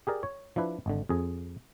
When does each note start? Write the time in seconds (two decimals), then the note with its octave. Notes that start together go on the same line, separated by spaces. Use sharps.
0.07 G4 G#4 A#4 D5
0.23 C#5
0.56 F3 D4 E4 B4
0.86 G#1 D3
1.09 F2 G#4